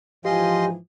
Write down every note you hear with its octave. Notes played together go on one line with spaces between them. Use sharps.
G#2 E3 F3 F4 G4 D#5 G#5 C6